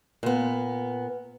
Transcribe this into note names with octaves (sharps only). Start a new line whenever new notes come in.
A#2 B3